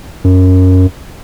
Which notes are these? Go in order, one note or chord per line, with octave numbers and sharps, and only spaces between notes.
F#2